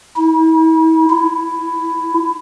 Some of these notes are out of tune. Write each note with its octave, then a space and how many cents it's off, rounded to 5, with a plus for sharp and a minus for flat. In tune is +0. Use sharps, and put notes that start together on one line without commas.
E4 -40
E4 +10